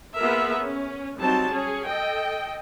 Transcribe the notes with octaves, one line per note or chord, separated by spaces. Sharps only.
A#3 B3 F4 G#4 A#4 E5
C#4
F#3 G3 C4 D#4 A5
C#4 G#4
A4 D#5 G5